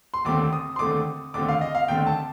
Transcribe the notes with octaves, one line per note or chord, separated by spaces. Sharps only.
C6
D#2 D3 A3 C4 D6
D#6
C6
D#2 D3 A3 C4 D6
D#2 D3 A3 C4 D6
F5
D#5
F5
D#2 D3 A3 C4 G5
A5